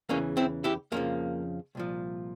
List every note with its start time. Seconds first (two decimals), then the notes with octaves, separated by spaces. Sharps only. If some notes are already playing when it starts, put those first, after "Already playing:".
0.09 E2 C#3 E3 A#3 C#4
0.37 C4 E4
0.64 E4 G4
0.92 F2 C#3 F3 A#3
1.75 C2 A#2 F3